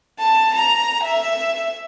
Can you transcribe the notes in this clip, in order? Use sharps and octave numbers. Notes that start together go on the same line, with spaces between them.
A5
A#5
E5